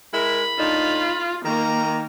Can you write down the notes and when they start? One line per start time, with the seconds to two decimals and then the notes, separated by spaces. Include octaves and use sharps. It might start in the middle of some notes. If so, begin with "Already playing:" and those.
0.14 G#3 E4 A#4 B5
0.59 A2 D4 D#4 F4
1.45 D#3 A#3 A#5